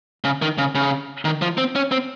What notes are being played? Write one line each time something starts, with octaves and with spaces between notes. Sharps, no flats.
C#3
D#3
C#3
C#3
D#3
F3
C4
C#4
C4